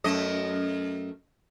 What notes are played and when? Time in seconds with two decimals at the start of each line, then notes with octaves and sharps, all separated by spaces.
0.04 F#2 A3 D#5